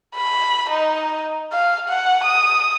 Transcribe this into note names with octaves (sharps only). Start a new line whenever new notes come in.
B5
D#4
F5
F#5
D#6